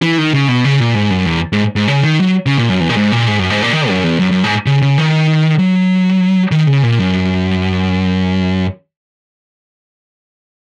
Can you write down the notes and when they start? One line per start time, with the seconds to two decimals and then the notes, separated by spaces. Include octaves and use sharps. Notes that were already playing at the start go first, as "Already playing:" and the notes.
0.02 E3
0.18 D#3
0.33 C#3
0.48 B2
0.65 C#3
0.80 A#2
0.94 G#2
1.10 F#2
1.26 E2
1.53 G#2
1.76 G#2
1.88 C#3
2.03 D#3
2.19 F#3
2.46 C#3
2.57 A#2
2.69 F#2
2.80 E2
2.89 A#2
2.97 G#2
3.12 A#2
3.28 G#2
3.39 F#2
3.50 G#2
3.62 A#2
3.73 D#3
3.89 F#2
4.04 E2
4.19 F#2
4.31 F#2
4.44 G#2
4.66 C#3
4.82 C#3
4.98 D#3
5.58 F#3
6.51 D#3
6.67 C#3
6.83 A#2
6.99 F#2